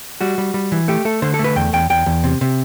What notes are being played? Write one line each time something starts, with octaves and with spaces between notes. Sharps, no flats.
G3 F#4
G3
G3
E3
A3 G4
A3 A4
D3 C5
A4
A3
B4
E2 G5
E2 G5
E2 G5
E2
C3
C3